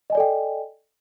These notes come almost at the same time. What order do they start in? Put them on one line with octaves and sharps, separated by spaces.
D#5 G#5 D5 A4 G5